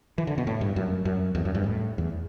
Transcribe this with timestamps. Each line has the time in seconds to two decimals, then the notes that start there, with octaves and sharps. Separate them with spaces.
0.18 E3
0.27 D3
0.38 B2
0.47 A2
0.61 G2
0.76 F#2
1.05 F#2
1.35 E2
1.45 F#2
1.55 G2
1.64 A2
1.98 E2